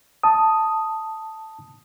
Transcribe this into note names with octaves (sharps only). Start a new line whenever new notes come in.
A5 D#6